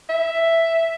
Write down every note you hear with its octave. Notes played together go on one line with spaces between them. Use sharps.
E5